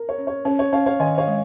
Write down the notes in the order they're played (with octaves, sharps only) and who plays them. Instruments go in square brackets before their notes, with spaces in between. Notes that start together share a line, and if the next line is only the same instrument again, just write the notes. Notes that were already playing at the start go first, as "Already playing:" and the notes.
Already playing: [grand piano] A#4
C#5
[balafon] C#4
[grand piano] C#5
[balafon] C#4 [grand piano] C#5
[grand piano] C#5
[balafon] C#4 [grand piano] C#5 F5
[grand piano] C#5 F5
[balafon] D#3 [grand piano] D#5 G#5
[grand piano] C#5 F5
[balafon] G#3